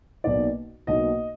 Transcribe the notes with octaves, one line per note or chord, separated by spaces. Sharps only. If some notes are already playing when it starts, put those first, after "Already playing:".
B1 B2 A#3 D#4 D5
B1 B2 A#3 D#4 D#5